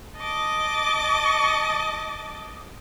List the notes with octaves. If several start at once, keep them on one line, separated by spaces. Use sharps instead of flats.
D#5 A5 D6